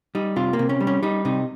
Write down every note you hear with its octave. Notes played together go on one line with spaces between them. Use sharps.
G3 D#4
C3 F4
A#3
C3
C#4
G3
C#4
G3 D#4
C3 D#4